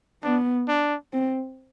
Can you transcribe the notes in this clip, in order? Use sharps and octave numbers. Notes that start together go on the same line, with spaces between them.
B3 D4
D4
C4